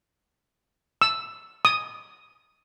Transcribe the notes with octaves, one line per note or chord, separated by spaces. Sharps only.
E6
D#6